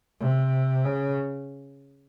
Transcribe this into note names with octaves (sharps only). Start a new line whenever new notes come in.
C3
C#3